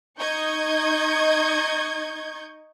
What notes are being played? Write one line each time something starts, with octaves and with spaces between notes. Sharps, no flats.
D#4 D#5 C#6 G6 G#6